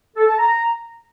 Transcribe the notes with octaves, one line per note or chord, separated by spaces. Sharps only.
A4
A5
A#5